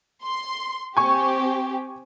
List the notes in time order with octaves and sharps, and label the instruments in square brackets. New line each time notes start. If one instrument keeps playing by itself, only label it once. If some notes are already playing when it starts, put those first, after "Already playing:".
[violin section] C6
[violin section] C4 G4 [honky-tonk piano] G#5 C#6